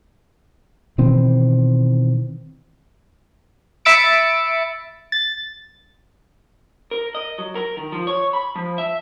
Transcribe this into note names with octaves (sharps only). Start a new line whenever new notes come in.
B2 D#3 E3 C4
E5 B5 E6 A6 C#7 D7
A6
A#4
D#5
F#3
A#4
D#3
F3
C#5
B5
F3
E5